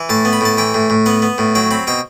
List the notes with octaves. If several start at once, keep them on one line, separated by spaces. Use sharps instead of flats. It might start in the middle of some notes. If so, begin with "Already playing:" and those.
Already playing: E3
A2 A5
B3
B5
A2 A5
E3 G5
A2
A2
B3 F#5
B3
A2
F#3 G5
C4 B5
B2 G5